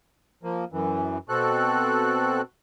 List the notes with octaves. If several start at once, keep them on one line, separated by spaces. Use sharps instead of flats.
F3 A#3
F#2 E3
B2 C4 F#4 A4 F#6